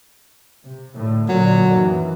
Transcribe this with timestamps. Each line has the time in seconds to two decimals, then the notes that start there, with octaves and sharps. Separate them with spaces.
0.64 C3
0.95 A2 D3
1.29 A#2 D3 F#3
1.70 F#2 D#3 E3